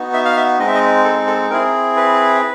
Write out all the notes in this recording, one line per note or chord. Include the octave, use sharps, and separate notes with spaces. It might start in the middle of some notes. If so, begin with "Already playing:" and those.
Already playing: B3 D#4 F#4
E5
F5
E5
G#3 C4 D#4 D#5
E5
D#5
A4
A4
C4 E4 G#4 A#4
B4